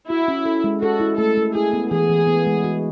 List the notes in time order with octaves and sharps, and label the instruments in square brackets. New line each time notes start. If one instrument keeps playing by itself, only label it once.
[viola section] E4 [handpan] F#4
[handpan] C#4
A4
G#3
[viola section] F#4 [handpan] A4
[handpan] E4
[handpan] A3 [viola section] A4
[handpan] A3
[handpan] E4 [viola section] G#4
[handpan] B3
[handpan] E3 [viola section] G#4
[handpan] E3
B3
G#3
F#4